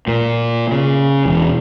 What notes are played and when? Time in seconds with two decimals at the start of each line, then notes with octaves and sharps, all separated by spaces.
0.08 A#2
0.72 C#3
1.26 E1